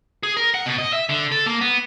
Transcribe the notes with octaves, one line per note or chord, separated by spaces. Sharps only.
G#4
A#4
F#5
B2
D#5
E5
D3
A4
A#3
B3